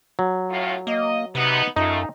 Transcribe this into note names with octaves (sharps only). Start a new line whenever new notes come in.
F#3
F#2 A2 F4
A#3 D#5
C3 B3 D#4
F#2 G#3 A3 D#4 F4